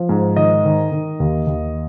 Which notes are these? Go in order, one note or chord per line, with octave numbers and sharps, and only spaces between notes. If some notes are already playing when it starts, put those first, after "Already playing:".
Already playing: F3
G#2
D#3 D#5
D#3
D#3
D#2
D#2